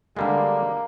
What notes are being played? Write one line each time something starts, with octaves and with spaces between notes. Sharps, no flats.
D3 G3 G#3 A#3